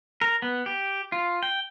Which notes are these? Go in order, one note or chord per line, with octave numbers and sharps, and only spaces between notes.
A#4
B3
G4
F4
G5